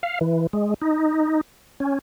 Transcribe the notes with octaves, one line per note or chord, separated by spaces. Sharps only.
F5
E3
G#3
D#4
C#4